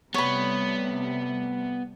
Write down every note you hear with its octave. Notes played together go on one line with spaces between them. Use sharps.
C3 G3 A3 B3 C#5 B5